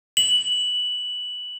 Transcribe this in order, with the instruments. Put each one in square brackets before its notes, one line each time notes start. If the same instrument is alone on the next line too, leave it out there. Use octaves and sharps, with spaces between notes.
[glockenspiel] F#7